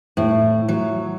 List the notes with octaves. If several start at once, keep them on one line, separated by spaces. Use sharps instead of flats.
A2
F#3